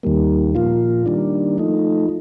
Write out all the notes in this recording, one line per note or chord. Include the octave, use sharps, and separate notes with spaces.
D#2 D#3 G3 A#3
A#2 F3 A#3 F4
D#3 G3 A#3 D4
F3 A3 D#4